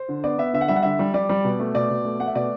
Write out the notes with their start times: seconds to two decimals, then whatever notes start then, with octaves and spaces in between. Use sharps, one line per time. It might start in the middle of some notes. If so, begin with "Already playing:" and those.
Already playing: C5
0.09 D3
0.24 B3 D5
0.38 B3 E5
0.53 D3 E5
0.61 F#5
0.68 G3 E5
0.76 F#5
0.83 D3 E5
0.99 G3
1.14 G3 D5
1.29 G3
1.44 B2
1.60 A3
1.74 B2 D5
1.90 B2
2.05 A3
2.19 A3 F#5
2.27 E5
2.35 B2 D5